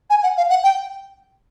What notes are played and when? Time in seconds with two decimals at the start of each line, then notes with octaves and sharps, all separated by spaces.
0.10 G#5
0.23 F#5
0.37 F5
0.50 F#5
0.63 G5